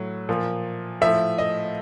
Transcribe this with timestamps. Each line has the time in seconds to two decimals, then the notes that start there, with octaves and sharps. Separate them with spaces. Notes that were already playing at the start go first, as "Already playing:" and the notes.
Already playing: A2 F#3
0.29 A#2 F3
1.01 A2 F3 E5
1.38 D#5